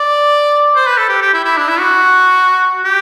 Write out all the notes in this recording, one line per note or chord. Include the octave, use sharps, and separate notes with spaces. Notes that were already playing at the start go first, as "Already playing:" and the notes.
Already playing: D5
C5
B4
A4
G4
G4
E4
E4
D4
E4
F#4
G4